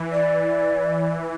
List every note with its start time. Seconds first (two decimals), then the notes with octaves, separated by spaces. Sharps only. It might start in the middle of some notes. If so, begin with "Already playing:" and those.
Already playing: E3
0.12 D5